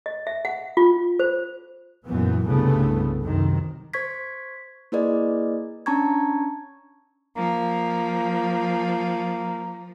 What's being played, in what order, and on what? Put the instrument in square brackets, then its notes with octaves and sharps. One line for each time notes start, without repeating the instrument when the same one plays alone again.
[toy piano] D#5
E5
F#5
F4
C5
[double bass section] F#2 A#2 E3 B3
C2 G2 C#3 A3 B3
F#2 C3 D#3
[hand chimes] C5 C#6 G#6 B6
A#3 E4 G#4 B4 D5 D#5
C#4 D4 A5 A#5 C#6 G#6
[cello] F3 [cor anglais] A#3